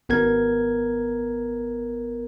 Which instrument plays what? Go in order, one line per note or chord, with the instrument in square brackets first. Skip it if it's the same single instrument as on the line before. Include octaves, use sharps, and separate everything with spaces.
[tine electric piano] G#1 B3 A#4 G#6